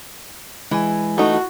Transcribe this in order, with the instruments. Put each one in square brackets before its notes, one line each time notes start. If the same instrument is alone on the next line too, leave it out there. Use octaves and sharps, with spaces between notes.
[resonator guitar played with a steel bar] E3 [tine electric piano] G#3 G#5
[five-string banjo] A3 D#4 [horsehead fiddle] F#4